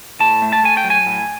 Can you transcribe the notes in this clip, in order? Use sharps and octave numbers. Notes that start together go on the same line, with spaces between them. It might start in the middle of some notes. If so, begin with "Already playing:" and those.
A2 A5
A3
A5
A3 G#5
G5
F#3
G#5
A2